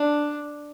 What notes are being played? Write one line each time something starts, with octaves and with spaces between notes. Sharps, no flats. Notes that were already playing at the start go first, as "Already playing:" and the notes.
Already playing: D4